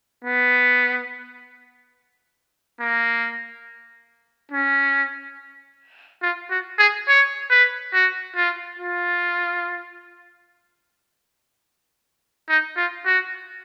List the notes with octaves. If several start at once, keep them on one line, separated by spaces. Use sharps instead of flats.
B3
A#3
C#4
F4
F#4
G#4
C#5
B4
F#4
F4
F4
D#4
F4
F#4